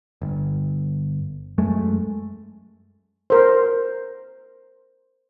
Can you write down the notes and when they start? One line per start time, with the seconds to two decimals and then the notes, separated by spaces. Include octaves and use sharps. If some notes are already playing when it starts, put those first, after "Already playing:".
0.22 G1
1.58 F#2 G#3 A3
3.30 A#4 C5